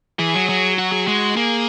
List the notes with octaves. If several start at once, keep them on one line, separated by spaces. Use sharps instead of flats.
E3 G#4
F#3
F#3
F#4
G#4
G#3 F#4
A#3 G#4